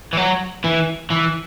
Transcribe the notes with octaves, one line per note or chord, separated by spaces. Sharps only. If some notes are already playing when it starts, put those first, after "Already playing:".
E3
F#3
E3
E3